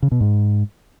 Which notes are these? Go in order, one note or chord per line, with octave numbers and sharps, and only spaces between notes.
C#3
B2
G#2